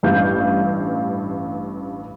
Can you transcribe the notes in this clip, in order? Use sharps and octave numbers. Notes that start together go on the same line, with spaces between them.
A1 G2 F5 G6